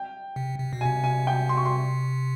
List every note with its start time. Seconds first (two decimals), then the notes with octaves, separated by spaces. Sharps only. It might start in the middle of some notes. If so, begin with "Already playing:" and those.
Already playing: G5
0.36 C3
0.59 C3
0.73 B2
0.81 C3 G#5
1.04 G#5
1.27 G5
1.49 C6
1.57 C#6
1.65 C6